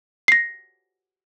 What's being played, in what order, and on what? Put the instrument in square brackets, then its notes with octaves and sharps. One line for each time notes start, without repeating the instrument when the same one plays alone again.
[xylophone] A#6 C7